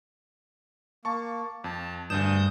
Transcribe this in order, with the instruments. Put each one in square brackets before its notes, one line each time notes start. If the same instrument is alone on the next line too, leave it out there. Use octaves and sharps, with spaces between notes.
[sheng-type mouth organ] A#3 [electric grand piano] A5 C#6
[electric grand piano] F2 [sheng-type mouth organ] A5
[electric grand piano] D2 D4 E7 [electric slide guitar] G2 [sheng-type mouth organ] D#6 G6